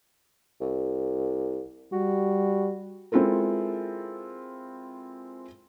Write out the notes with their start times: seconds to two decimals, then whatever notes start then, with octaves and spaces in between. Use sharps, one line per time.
0.61 C2
1.92 G3 F#4
3.12 G#3 C4 E4 F4 A4 A#4